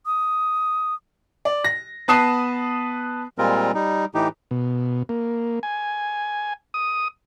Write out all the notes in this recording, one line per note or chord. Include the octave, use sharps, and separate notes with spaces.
D#6
D5
A#6
B3 B4 A5 D#6 C7 E7
A#2 G3 G#3 C4 F4 A#4
G3 D#4
A2 E3 D#4 G4
B2
A#3
G#5
D#6